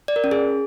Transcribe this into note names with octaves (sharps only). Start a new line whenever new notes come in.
D5
A#4
C#4
G#4